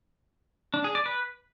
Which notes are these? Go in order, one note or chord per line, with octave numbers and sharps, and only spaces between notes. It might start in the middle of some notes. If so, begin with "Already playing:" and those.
D4
G#4
D5
B4